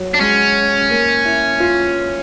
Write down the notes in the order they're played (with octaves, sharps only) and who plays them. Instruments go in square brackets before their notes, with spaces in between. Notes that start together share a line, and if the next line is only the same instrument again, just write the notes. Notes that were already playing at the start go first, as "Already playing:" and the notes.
Already playing: [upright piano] F#3
[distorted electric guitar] D4
[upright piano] G#3 [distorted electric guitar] C#4
[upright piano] A#3
E4
F4